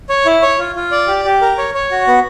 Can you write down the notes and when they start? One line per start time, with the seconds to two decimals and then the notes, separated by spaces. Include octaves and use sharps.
0.09 C#5
0.25 E4
0.42 C#5
0.59 F4
0.75 F4
0.91 D5
1.07 G4
1.25 G4
1.41 A#4
1.58 C#5
1.74 C#5
1.91 F#4
2.07 B3